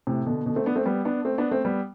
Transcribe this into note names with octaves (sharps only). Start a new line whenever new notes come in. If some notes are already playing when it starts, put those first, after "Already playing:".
A2 C3
B2 D3
B2 D3
A3 C4
B3 D4
A3 C4
G3 B3
B3 D4
A3 C4
B3 D4
A3 C4
G3 B3